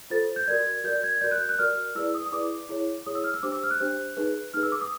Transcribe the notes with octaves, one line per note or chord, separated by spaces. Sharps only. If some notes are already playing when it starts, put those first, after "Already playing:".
F4 A4 C5 A6
G6
F#4 A#4 D5 G#6
F#4 A#4 D5 G6
G#6
F#4 A#4 D5 G6
F#6
G6
F#6
F#4 A#4 D5 F6
E4 G#4 B4 D5 E6
D#6
D#6
E4 G#4 B4 D5 D6
E4 G#4 C#5
E4 G#4 C#5 D#6
E6
F6
E6
D4 G4 C5 D6
E6
F6
F#6
D4 G4 C5
D#4 G#4 B4
D#4 G#4 B4 F6
E6
D6
D#6